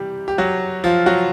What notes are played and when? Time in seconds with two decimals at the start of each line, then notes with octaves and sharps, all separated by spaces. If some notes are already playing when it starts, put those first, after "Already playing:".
Already playing: C3 E3 G3 G4
0.28 G4
0.38 F#3 F#4
0.84 F3 F4
1.06 F#3 F#4